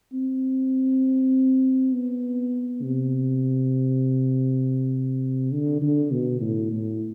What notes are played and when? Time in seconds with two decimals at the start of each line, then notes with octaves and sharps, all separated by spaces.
0.13 C4
1.93 B3
2.82 C3
5.52 D3
5.82 D3
6.12 B2
6.41 A2
6.72 A2